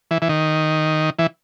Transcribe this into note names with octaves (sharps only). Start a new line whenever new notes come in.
E3
E3
D#3
E3